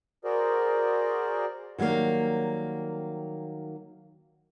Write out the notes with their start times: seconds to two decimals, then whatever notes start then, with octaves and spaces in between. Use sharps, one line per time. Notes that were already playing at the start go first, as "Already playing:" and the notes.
0.24 F#4 G#4 A#4 C5 D5
1.78 D#3 F#3 G3 A#3 D#4